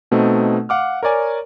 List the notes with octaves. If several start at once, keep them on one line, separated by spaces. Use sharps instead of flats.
B2 A3 C4 D#4
F5 F#5 D6 F6
A#4 C#5 D5 G#5